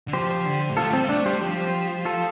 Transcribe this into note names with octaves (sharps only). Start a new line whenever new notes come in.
D3
F3 G4 C5
D3
A2
C3 F4 A4
A3
G3 C4
A3 D4
G3 G4 C5
F3 G4 C5
F4 A4